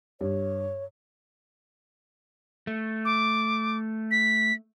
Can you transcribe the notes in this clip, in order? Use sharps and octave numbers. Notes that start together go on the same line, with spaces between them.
G2 C#5
A3
D6
B6